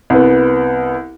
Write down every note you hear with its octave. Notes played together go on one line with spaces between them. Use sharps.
C2 B3